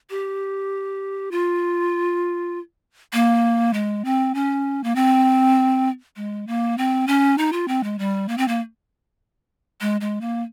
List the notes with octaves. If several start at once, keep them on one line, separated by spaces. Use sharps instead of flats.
G4
F4
A#3
G#3
C4
C#4
A#3
C4
G#3
A#3
C4
C#4
D#4
F4
C4
G#3
G3
A#3
C4
A#3
G#3
G#3
A#3